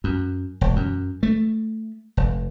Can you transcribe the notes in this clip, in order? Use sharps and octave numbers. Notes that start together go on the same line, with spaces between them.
F#2
E1
F#2
A3
F1